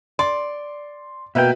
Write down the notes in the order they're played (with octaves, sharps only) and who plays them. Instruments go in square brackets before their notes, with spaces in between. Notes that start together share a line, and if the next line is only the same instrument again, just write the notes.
[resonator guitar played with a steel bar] D5 [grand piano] C6
[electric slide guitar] B2 A#3 G5 [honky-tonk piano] F#4 B4 E5